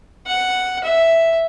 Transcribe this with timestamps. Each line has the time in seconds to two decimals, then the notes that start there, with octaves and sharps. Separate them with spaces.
0.26 F#5
0.83 E5